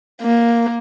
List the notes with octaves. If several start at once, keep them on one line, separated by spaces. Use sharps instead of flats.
A#3